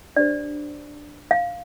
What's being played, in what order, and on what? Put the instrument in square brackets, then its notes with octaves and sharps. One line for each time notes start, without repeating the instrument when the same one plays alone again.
[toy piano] D4 G4 C5 D5
F5